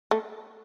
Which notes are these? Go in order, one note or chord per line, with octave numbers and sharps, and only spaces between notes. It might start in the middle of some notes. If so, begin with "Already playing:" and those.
A3